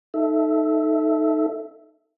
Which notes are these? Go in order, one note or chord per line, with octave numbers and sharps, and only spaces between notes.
D#4 A4 E5